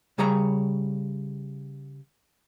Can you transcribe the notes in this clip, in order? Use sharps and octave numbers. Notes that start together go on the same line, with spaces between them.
C#3 G3 G#4 C#5 A#5